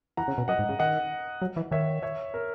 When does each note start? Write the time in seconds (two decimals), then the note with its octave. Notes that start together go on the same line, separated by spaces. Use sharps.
0.17 E3 F#5 A#5
0.28 C#3
0.38 B2
0.48 F#2 D#5 F#5
0.59 G#2
0.69 C#3
0.79 D#3 D#5 F#5
1.42 F#3
1.56 E3
1.71 D#3 C#5 E5
2.03 C#5 E5
2.34 A#4